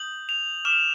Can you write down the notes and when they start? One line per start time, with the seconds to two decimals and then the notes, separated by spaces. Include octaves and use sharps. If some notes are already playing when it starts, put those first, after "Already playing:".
Already playing: D#6 G6 F#7
0.29 F7
0.65 D6 F6 E7